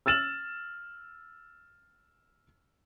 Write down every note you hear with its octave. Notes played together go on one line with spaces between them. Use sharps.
E6 F6 A6 E7 F#7